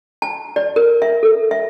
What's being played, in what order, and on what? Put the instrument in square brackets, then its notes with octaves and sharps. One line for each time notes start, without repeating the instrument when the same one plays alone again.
[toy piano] A5
D5
A#4
E5
A4
E5